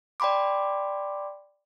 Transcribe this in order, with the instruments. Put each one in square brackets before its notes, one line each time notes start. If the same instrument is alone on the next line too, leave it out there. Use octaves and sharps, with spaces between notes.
[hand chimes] D5 G5 B5 C6 D6